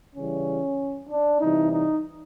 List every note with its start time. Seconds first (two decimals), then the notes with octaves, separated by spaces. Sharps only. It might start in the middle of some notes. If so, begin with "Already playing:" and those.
0.15 C#3 E3 G3 C#4
1.10 D4
1.41 C3 E3 G3 D#4
1.73 D#4